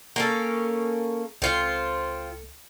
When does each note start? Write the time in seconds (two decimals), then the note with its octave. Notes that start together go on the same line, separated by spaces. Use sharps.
0.16 A#3 C#4 A4
1.42 C#2 C4 F4 A4 C#7